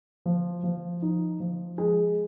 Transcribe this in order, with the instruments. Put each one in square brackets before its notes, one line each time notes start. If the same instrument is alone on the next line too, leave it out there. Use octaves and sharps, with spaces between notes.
[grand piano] F3
F3
D#4
F3
G#3